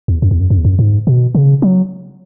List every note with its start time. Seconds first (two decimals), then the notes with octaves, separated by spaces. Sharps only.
0.08 E2
0.22 F#2
0.31 E2
0.40 F#2
0.50 F#2
0.58 E2
0.65 F#2
0.79 G#2
1.07 B2
1.35 C#3
1.62 F#3